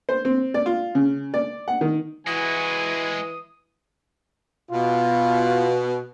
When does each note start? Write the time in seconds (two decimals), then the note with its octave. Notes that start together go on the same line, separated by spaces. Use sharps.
0.09 C5
0.25 C4
0.54 D5
0.66 F4
0.95 C#3
1.34 D5
1.68 F#5
1.81 D#3
2.27 E3 G#3 E4 F#4 G#5 D#6
4.71 B2 F4